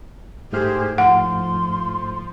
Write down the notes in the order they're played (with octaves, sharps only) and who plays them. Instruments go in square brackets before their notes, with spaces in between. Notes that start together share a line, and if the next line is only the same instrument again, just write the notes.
[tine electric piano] G#2 A3 F6 [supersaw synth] G4 C5 [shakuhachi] G#4
[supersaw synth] F3 [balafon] F#5 [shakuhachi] C6